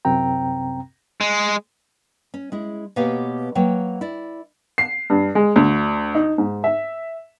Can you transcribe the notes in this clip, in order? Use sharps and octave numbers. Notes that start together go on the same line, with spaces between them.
C2 F#2 C3 C4 G5 A#5
G#3
C#4
G#3 C#4 E4
B2 A#3 G4 B4 C#5 F5
F#3 A#3 B4 C#5 G5
E4 D5
C7
G2
G#3
D2
D#4
G#2
E5